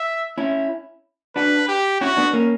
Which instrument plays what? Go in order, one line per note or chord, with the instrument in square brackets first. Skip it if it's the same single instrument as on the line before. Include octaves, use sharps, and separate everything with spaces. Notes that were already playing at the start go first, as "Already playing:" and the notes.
Already playing: [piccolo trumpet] E5
[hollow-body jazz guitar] C#4 E4
[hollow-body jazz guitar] D4 F#4 [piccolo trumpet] B4
[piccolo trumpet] G4
[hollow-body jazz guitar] C#4 E4 [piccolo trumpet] F#4
[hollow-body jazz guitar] B3 D4
A#3 C#4